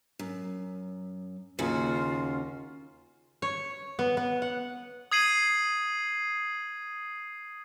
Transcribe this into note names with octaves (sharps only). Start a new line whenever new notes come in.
F#2
D#2 C#3 F4 F#4
C#5
B3
B3
F#5
D#6 G#6 C7 D#7 F#7